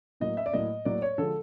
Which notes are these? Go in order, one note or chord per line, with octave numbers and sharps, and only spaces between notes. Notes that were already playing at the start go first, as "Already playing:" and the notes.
A2 F#3 A#3 D#5
E5
D5
A2 F#3 A#3 D#5
A2 F#3 A#3 D5
C#5
D3 F3 G#3 A4